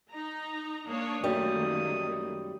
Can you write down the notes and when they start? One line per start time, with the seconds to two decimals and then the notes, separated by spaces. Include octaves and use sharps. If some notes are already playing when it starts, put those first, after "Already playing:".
0.11 D#4 A#5
0.88 A#3 D4 C#5 D#6
1.23 F#2 D#3 G3 A3 A#3